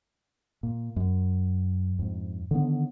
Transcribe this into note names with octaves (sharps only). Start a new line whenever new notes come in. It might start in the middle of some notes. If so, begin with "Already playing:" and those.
A#2
F#2
F2 G#2
D3 D#3 B3